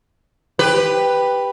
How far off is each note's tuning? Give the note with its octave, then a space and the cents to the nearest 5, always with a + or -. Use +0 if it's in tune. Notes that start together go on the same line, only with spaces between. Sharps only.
G4 +10 B4 +0